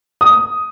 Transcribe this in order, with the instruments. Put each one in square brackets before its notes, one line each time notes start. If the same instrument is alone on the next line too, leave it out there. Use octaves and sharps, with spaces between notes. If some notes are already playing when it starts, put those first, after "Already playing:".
[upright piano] D#6